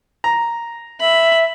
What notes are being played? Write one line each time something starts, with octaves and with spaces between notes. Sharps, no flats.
A#5
E5 B5